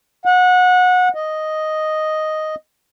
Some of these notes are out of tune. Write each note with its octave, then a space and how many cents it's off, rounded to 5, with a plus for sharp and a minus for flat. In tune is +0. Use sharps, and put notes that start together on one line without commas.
F#5 -25
D#5 +0